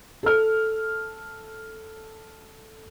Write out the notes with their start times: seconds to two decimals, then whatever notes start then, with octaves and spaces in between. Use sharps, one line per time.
0.23 A4 F6